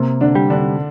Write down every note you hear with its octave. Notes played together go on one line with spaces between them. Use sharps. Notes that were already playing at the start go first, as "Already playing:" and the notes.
Already playing: C3 A#3
D3 D4
G3
D3 D4